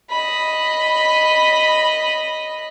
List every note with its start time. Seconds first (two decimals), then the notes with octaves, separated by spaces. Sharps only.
0.10 D#5 B5